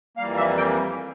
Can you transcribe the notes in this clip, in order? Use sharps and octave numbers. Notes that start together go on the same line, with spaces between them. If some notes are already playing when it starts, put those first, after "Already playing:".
F2 E3 G3 A#3 F5
E5
G5